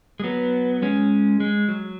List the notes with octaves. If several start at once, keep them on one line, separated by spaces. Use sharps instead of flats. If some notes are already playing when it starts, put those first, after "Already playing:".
G#3
F#3 B3
G#3 C#4
G#3
F#3